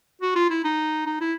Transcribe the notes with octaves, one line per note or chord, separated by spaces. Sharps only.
F#4
F4
E4
D#4
D#4
E4